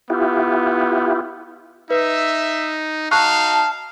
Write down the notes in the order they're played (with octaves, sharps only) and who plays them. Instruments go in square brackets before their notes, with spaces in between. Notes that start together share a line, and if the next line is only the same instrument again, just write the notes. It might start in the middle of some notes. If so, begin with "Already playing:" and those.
[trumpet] B3 [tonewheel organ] E4 F4 G4
[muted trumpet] D#4 [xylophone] B4 [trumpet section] E5
[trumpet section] D#4 F#4 [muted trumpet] F5 [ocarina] A5 [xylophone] C#6 F#6